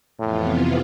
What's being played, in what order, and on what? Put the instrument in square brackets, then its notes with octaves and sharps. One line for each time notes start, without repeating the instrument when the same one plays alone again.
[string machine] F2 C3 E3 B3 F4 [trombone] A2